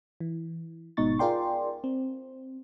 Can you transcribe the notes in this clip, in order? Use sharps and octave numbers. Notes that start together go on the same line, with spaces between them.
E3
G#1 G#2 B2 D#4 C#6 A6
F4 G#4 A#4 D5 G5 C6
C4